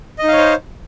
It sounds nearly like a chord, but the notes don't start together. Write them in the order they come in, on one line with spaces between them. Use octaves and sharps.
D#5 D#4 F5 C#5 C5